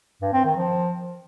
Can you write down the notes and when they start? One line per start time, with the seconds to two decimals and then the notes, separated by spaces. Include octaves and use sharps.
0.22 G2
0.33 C4
0.45 D#3
0.56 F3